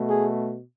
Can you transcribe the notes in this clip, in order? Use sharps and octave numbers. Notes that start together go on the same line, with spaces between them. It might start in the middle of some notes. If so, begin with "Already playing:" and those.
Already playing: B2 A3
G#4